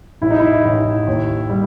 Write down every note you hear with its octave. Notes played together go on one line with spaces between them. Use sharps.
A1 E4
D#4
E4
A1
D#2
G3